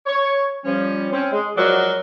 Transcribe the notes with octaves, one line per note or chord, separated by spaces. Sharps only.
C#5
F3 G3 C#4
C4 C#4
G#3
F3 F#3 G#3 F#4 A#4 D5